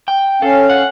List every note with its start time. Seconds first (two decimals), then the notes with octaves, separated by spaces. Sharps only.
0.08 G5
0.42 C#4 A4 F5
0.70 F#5